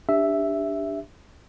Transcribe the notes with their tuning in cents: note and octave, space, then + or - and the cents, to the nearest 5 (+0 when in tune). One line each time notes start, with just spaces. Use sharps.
D4 +0 G4 +20 E5 +0